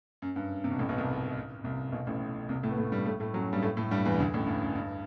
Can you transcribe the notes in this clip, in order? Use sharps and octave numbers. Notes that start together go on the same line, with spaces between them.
F#2
G2
C3
B2
A1 A2
B1 B2
C2 C3
C2 C3
B1 B2
A1 A2
C2 C3
A2 A3
B3
A2 A3
G2 G3
A2 A3
A2 A3
F#2 F#3
G2 G3
A2 A3
A2 A3
G2 G3
E2 E3
D2 D3
A1 A2
G2
F#2
G2